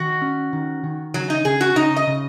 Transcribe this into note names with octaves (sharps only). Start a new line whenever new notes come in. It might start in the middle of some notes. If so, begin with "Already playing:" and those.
Already playing: D#3 F#4
C#4
D#3
D#3
C#3 F#3
D#4
C#3 G#4
F#4
C#3 D#4
D#5
C#3